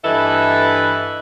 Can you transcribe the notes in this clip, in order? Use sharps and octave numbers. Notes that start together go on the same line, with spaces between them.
G2 E3 A4 B4 D#5 E5